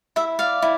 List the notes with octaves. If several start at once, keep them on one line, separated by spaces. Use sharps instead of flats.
E4 E5
D5 F5
E4